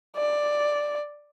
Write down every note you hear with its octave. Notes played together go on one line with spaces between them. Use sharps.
D5